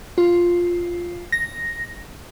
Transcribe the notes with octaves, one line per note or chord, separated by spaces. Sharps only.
F4
A#6